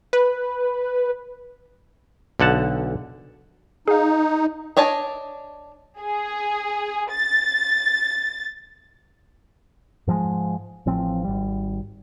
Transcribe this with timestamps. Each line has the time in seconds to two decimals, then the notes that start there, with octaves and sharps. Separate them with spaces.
0.13 B4
2.40 B1 D3 F#5 A5
3.88 D#4 G#4 F5
4.77 D4 C#5 D#5 A5
5.99 G#4
7.10 A6
10.07 G#2 F3 F#3 G#3
10.86 A1 A2 F3 C4
11.24 G#1 G3